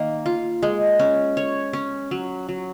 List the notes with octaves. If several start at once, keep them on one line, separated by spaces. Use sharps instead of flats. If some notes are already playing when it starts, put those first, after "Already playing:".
Already playing: D#3 A#3
F4
G#3
C#4
C#5
C#4
F#3
F#3